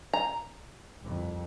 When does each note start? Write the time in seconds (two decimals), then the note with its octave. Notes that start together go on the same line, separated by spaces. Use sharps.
0.13 A#5
1.01 C2 F2